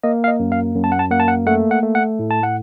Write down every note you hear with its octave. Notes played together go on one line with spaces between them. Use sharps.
A#3 D#5
F5
D#5
F#2
F5
F#2
A5
F#5
A5
A#3 F#5
A5
F#5
A3 F#5
F#5
A3
F#5
A2
A5
F#5